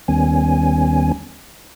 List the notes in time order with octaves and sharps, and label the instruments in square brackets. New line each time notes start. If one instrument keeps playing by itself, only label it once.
[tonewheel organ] D#2 D#3 G3 B3 C#4 G#5